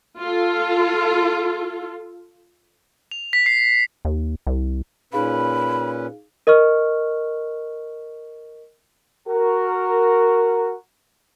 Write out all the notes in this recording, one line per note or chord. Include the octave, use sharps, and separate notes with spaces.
F4 A4
F7
B6
C7
D#2
C2
A#2 C#4 D#4 G#4 B4 F5 B5
A#4 D#5 C#6 F6
F#4 A#4